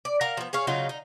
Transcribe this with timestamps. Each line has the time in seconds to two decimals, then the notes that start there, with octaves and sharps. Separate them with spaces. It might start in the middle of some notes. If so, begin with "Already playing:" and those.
0.05 D5
0.21 A#4 F5 F#5 A#5
0.37 F3 B3
0.53 G#4 C#5 F5
0.67 C#3 F#3 D#4 F4
0.89 D#4